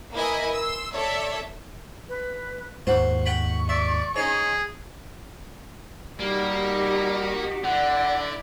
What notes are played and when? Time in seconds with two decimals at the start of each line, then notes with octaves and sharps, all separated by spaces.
0.14 A#3 E4 B4 D#5 G#5
0.57 C6 E6
0.95 A4 C#5 D5 E5
2.09 B4
2.87 D#2 G#2 C5 F#5 C#6
3.26 F#5 G5 B5
3.69 D5 E5
4.16 C#4 D#4 G#4 C#5
6.20 G3 A#3 D#4 F#4 G4
7.64 D3 D4 E4 D5 F#5